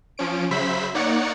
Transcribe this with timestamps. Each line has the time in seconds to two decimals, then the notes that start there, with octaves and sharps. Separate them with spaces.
0.18 F3 C#4 D7
0.51 C#3 F#3 C5 E5 B5 B6
0.94 A#3 D#4 C#5 D5 F#5 C#7